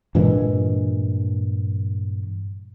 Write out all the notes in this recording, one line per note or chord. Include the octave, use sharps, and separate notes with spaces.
G2 A#2 E3 G#3